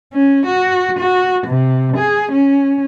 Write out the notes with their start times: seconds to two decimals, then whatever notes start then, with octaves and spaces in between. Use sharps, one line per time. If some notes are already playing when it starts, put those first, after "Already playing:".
0.13 C#4
0.46 F#4
0.99 F#4
1.47 C3
1.96 G#4
2.31 C#4